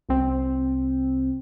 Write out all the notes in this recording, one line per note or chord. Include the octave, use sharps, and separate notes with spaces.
C2 C4